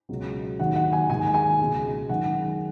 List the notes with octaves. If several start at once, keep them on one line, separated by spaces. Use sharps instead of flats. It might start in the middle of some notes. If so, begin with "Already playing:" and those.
C#2 B2 F#3
D#2 D#3 F#3 F#5
F#5
G#5
D#2 D#3 G#3 G#5
G#5
C#2 B2 G#3
F#2 D#3 G#3 F#5